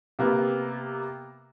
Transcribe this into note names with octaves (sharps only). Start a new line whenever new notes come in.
C3 A#3 B3